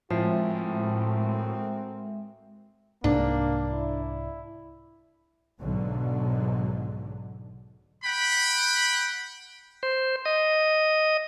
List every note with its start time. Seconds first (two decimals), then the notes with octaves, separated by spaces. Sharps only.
0.10 A2 F3 G#3 C4 F#4 A#4 E5
3.04 C2 G#2 A#3 D4
3.72 E4
5.60 B1 G#2 D3 F#3
8.04 F#5 G5 B5
9.83 C5
10.25 D#5